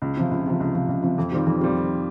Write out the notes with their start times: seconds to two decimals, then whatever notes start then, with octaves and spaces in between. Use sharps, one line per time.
0.02 C#2
0.17 C3 F3
0.31 C#2
0.46 C3 F3
0.60 C#2
0.74 C3 F3
0.88 C#2
1.02 C3 F3
1.18 F2
1.31 D#3 G3 C4 F4
1.46 F2
1.61 G3 C4 F4